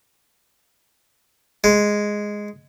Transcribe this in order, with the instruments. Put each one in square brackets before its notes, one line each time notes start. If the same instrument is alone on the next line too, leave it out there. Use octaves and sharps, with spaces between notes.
[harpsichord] G#3